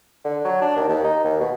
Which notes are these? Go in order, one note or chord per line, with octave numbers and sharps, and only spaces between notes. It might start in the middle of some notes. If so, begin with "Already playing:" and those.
D3
F#3
D4
D#2
D#2
D#4
D#2
B2